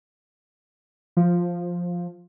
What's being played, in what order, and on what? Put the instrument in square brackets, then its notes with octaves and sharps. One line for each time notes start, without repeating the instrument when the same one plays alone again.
[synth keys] F3